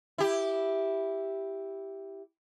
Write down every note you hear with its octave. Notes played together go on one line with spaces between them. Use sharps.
E4 G4